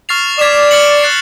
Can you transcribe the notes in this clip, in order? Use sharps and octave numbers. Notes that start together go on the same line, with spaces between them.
C#6 F6 A6 C7 F7
D5 G#6 B6 E7
F6 A6 C#7 F#7
F#6 A6 C7